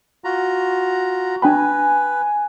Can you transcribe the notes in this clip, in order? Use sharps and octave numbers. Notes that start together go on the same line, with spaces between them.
F4 F#4 A#5
D4 B4 G5 G#5 B5